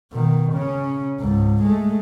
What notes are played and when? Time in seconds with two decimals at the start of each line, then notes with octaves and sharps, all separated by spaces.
0.12 B2 D#3
0.53 C#3 C#4
1.19 C#2 G#2
1.63 G#3 A3